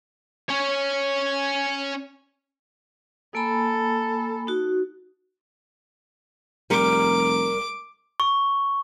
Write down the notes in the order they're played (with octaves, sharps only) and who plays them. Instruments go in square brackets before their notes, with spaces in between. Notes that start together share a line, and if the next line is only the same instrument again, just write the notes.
[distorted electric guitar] C#4 C#5
[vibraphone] A#3 G#5 B5 [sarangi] A4
[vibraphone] D#4 F#4
[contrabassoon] F1 [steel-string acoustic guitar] G3 A#4 [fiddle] D6
[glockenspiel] C#6